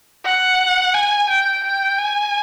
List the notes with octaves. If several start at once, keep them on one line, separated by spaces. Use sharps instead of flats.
F#5
G#5
G5
G5
G#5